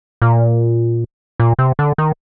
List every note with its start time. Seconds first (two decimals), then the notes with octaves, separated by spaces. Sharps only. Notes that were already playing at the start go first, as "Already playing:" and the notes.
0.22 A#2
1.40 A#2
1.59 C3
1.79 D3
1.98 D#3